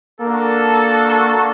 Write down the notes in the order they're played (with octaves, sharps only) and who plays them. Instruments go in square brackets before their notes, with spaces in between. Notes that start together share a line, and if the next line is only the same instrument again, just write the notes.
[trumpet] A#3 [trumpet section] D4 F#4 A4